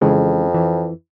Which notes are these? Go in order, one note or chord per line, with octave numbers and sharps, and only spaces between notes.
F2 C#3 E3 G#3
E3